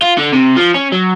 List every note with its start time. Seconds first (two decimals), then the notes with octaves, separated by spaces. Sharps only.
0.02 F4
0.18 D3
0.32 C3
0.56 F3
0.74 C#4
0.92 F#3